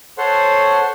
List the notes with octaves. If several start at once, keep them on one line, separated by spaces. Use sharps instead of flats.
A4 C5 C#5 F#5 C6